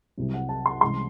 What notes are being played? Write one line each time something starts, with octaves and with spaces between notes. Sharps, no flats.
C2 C3 F#3
F#5
A5
C6
C2 C3 E3 G#3 C#4 C6